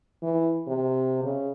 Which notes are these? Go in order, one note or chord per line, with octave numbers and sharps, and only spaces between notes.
E3
C3
C#3